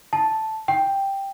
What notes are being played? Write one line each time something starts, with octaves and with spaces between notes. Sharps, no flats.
A5
G5